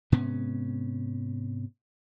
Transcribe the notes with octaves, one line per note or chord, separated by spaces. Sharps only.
G#2 C3 B3 C#4